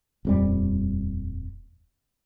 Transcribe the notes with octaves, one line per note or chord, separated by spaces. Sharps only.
D#1 F2 G3